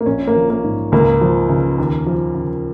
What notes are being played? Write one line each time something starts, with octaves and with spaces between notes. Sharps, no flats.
A#3
A#1 C#4
A#3
F3
A#3
G#2
C#2 A#3
F3
C#3
D#2
F3
C#3